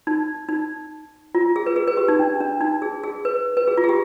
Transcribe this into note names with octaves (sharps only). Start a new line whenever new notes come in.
D#4
D#4
F4
G#4
B4
G#4
B4
G4
D#4
D4
D4
D#4
G#4
G#4
B4
B4
G#4
F4
G#4
G4